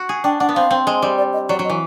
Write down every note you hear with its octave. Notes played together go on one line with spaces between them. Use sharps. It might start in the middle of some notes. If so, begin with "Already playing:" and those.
Already playing: F#4
G#4
D4 G5
D4 F#5
B3
C4 F5
C4
G#3
G3
D5
D#5
F#3 D5
F#3
D#5
E3